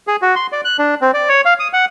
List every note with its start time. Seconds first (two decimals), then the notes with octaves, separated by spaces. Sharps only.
0.07 G#4
0.22 F#4
0.36 C6
0.52 D5
0.65 F#6
0.78 D4
1.01 C4
1.14 D5
1.29 C#5
1.45 F5
1.59 D#6
1.73 F#5